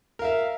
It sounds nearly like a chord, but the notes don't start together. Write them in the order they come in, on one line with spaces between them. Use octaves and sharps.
A#4 F5 E5